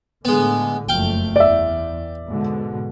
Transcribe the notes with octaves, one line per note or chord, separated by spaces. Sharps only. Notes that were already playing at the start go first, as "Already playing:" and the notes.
A2 D3 G#3 B3
F#1 F2 A3 F5 G5
E2 D5 E5
G#2 B2 D3